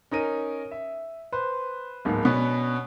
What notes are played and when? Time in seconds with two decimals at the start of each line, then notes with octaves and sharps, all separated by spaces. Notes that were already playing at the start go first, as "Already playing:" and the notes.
0.11 C#4 D#4 A#4 D#7
0.71 E5
1.32 B4 C5
2.05 D1 G#2 A#3 B3
2.25 B2 B3 C#4 D4